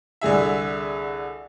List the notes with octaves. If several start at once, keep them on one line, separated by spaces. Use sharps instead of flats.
C2 D3 G#4 E5